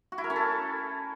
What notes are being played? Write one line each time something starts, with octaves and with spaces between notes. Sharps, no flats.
F#4
E4
A#4
C#4
A4